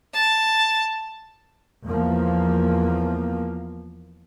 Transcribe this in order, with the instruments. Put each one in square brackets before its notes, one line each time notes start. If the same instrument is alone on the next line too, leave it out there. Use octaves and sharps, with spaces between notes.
[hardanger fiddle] A5
[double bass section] E2 F3 A#3 B3